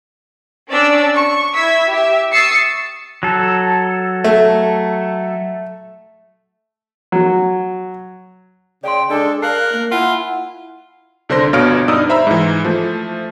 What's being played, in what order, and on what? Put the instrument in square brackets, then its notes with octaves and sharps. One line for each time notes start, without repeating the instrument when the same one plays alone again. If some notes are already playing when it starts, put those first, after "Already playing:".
[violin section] C#4 D4 D5 E6
C#6
E4 E5 E6 G#6 B6
G4 E5
C#6 D#6 E6 A6 C7 C#7
[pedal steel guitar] F#3 A4
[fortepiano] A3
F#3
[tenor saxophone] C#3 [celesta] D5 C6 [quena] G5
[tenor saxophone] G#3 [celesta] D4 [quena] A4 [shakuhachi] D5
[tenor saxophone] A#4 [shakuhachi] F5 [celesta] A5 C7 [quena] F#6
[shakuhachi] A#3
[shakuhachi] E4 [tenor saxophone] F4 [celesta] F#5 [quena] G#5
[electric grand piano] C2 D3 D4 C5 C6 A#6
G1 B2 C#5 F5 F6 D7
G2 D#4 D5 D#5 D#6 E6
C5 E5 A#5 B5 E6
G#2 E3
F3 A3